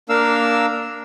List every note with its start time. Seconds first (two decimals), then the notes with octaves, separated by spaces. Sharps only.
0.09 A#3 D4 A#4 F5 E6